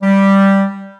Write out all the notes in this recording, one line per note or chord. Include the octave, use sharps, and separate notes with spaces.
G3